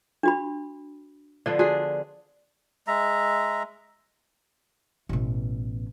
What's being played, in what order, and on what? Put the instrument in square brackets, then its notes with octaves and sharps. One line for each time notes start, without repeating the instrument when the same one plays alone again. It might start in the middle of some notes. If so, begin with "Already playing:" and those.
[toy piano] D4 F#4 B5
[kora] D3 F3 B3 [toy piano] D5
[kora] D4 G#4 [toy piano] F#4
[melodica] G#3 E5 A#5
[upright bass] A1 B2